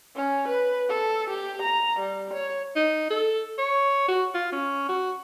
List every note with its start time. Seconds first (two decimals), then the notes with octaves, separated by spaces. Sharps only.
0.16 C#4
0.48 B4
0.89 A4
1.30 G4
1.62 A#5
1.99 G3
2.34 C#5
2.76 D#4
3.10 A4
3.59 C#5
4.08 F#4
4.34 F4
4.52 C#4
4.89 F#4